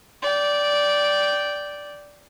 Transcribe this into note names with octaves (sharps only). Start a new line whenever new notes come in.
D5 G5